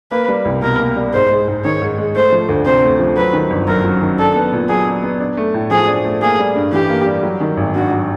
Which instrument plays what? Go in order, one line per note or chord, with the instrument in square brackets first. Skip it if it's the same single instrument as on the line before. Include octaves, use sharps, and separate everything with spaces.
[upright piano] A#3 [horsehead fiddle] B4
[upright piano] G3
C2
[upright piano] B2 [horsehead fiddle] A#4
[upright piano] A#3
G3
[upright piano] G#2 [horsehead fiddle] C5
[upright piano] G#3
G#2
[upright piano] D#3 [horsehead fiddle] C#5
[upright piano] G#2
G#3
[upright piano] A3 [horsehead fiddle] C5
[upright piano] F3
D2
[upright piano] C3 [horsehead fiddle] C5
[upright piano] A3
F3
[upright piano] F#3 [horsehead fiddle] B4
[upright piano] D#3
G1
[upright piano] F#2 [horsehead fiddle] A#4
[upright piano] F#3
D#3
[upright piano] D4 [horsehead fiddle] A4
[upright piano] B3
A#2
[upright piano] F#3 [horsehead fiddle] G#4
[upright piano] D4
B3
D4
A3
A2
[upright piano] F3 [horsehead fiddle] G#4
[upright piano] D4
A3
[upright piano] A#3 [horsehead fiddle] G#4
[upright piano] G3
G2
[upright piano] E3 [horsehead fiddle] G4
[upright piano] A#3
G3
F#3
D#3
G#1
[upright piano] G2 [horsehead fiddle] F#4
[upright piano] F#3